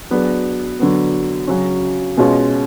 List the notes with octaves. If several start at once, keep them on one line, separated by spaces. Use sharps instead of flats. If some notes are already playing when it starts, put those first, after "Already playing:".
F#3 B3 D4 G#4
D3 F#3 B3
C#3 F#3 C#4
B2 G#3 C#4 F4